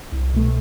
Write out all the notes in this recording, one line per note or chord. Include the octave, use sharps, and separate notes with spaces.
C2
B2 A3